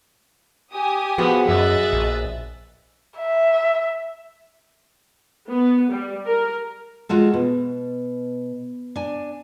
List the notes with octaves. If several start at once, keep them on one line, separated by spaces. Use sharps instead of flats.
G4 G#5 D#6
F3 B3 F#4 G#4 F#5
F#2 D#5 E5 F#6 A6
A#1
E5
B3
G3
A#4
G#3 F4 F#4 A4
B2
D4 G#5